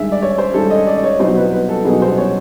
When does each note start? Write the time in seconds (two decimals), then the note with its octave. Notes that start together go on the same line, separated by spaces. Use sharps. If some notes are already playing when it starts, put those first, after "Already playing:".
Already playing: G2 D#3 G#3 E5
0.12 D5
0.22 C#5
0.38 C5
0.54 G2 D#3 G#3 A4
0.70 D#5
0.87 D5
1.03 C#5
1.20 C2 B2 F#3 B3 D#4 C5
1.37 B4
1.53 B4
1.69 A4
1.85 C2 B2 F#3 B3 D#4 G#4
2.02 C5
2.18 C#5